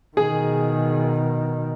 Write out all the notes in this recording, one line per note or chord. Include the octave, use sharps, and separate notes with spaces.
B2 D#3 G#4